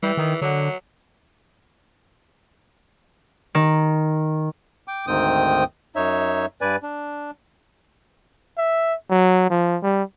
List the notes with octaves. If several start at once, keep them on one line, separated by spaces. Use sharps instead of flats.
E3 G3
D#3
D3 F#3
D#3
G5 D6
D2 G#2 D#3 C4 G5 D#6
F#2 D#4 C#5 E5
G2 B4 D5 G#5
D4
E5
F#3
F3
G3